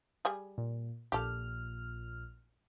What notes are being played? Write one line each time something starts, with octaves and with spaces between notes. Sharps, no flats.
G3 G#4
A#2
A#1 A#2 G4 A4 F6